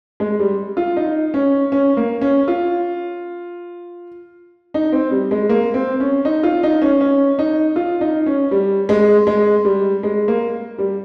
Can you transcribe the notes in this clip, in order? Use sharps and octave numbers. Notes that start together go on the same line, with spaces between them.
G#3
G3
F4
D#4
C#4
C#4
A#3
C#4
F4
D#4
C4
G3
G#3
A#3
C4
C#4
D#4
F4
D#4
C#4
C#4
D#4
F4
D#4
C#4
G3
G#3
G#3
G3
G#3
A#3
G3